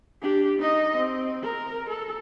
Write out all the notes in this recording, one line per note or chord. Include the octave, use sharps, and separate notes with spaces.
D4 G4
D#4 D#5
C4
A#4
A4